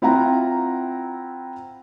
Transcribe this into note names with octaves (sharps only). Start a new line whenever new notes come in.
C4 E4 F4 F#5 G5 A#5